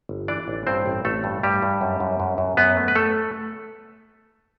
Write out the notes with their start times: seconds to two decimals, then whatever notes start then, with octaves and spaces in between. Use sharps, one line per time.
0.09 G1
0.28 E3 D4 D5
0.48 A1
0.67 G2 C4 C5
0.86 A1
1.05 A1 A3 A4
1.24 G2
1.43 G2 G3 G4
1.62 G2
1.81 F#2
2.00 F#2
2.20 F#2
2.38 F#2
2.57 F#2 B3 B4
2.77 A3
2.88 B4
2.95 A3 A4